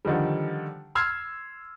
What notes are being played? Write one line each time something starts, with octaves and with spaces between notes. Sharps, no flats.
D3 D#3 F3 G3
C6 E6 F6 G#6 C7